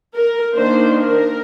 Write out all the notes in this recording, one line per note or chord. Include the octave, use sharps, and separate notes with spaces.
A#4
D#3 A#3 D4 C5
A#4